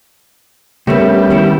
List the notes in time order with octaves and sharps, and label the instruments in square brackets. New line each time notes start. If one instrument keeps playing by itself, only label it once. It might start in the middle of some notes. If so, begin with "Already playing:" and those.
[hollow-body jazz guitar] G2 A3 B3 [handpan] C#3 [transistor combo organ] G3 [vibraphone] A#4 C#5 E5
[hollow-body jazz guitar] D#3 C#4 E4 [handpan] B3